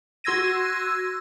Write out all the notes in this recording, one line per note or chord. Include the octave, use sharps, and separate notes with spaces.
F#4 C6 E6 G#6 A#6 D#7